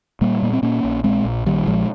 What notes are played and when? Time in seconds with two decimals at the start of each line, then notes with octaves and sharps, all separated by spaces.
0.21 A#2 G3 A#3
0.42 A#2 A#3
0.53 C4
0.62 A#2 A#3 C#4
0.84 A#1
1.04 A#2 G#3 C4
1.25 A#1
1.46 A#2 D#3 G3
1.67 A#1 F3 G#3